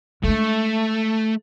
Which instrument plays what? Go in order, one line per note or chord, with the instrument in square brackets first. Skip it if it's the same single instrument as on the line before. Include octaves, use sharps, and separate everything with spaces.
[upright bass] G#3 D4 [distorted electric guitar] A3